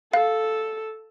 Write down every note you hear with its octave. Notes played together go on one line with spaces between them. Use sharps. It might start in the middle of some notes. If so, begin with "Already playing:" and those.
A4 F5